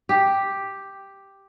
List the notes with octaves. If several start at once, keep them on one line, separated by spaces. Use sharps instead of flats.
G4